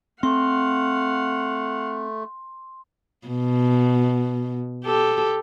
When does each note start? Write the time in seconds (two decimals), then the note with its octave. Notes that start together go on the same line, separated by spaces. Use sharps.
0.23 A3 C4 F5 F#5 C6
3.27 B2
4.85 G4 A4